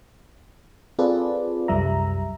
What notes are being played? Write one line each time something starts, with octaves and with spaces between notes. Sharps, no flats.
C4 F4 G#4 A4 B4 D5
C2 F#2 G3 E5 A#5